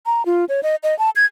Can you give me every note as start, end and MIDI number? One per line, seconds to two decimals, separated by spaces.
0.06 0.25 82
0.26 0.45 65
0.49 0.61 73
0.63 0.76 75
0.83 0.97 75
0.99 1.10 81
1.16 1.25 92